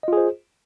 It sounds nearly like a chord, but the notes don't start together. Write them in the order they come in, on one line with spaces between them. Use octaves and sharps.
D#5 F4 G#4 C5